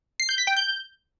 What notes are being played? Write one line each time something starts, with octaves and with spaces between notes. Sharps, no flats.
C7
G6
B6
G5
G6